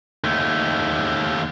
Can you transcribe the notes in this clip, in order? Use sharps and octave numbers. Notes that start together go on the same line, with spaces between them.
D#2 A3